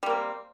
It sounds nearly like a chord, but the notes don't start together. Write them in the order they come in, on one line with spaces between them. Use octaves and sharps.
G3 A#3 C4